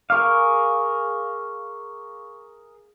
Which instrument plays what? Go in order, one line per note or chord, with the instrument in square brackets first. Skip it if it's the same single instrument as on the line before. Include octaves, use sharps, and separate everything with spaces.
[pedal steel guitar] G#4 A#4 F5 [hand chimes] C#6 D6